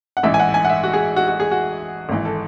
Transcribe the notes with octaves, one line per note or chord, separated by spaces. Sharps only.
F#5
A1 G#2 E3 E5
G#5
F#5
G#5
F#5
E5
F#4
G#4
F#4
F#4
G#4
F#4
G#1 G#2 E3
A4